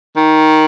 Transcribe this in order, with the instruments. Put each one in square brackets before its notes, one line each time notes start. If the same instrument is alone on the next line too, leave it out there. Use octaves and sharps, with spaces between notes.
[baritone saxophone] D#3